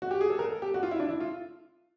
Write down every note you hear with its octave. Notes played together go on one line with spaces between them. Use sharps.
F#4
G4
G#4
A4
A#4
A4
G4
F#4
F4
E4
D4
E4
F4